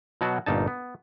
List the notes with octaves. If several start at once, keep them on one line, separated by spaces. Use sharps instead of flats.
B2 F#3 F#4 A5
G1 A#2 D#4 A5
B3